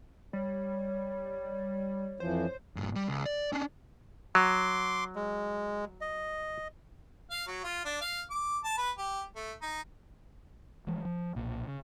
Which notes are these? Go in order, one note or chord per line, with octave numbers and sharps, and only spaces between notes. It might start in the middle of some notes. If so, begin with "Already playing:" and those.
G3 C#5
F2 E3 F3 C5
G2 A#2
G3
C#2
D5
C#4 D4
F#3 C6 D6
G#3
D#5
F5
F#3
F4
D4
F5
D6
A5
B4
G4
A3
D#4
E3 F3 G#3
F3
B1 A#2
C#3